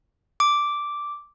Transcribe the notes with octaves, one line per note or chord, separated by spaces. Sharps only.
D6